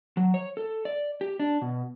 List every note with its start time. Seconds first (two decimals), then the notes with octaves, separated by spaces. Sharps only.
0.17 F#3
0.34 C#5
0.57 A4
0.85 D5
1.21 G4
1.40 D4
1.62 B2